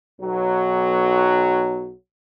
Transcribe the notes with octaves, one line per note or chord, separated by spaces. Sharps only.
B1 F#3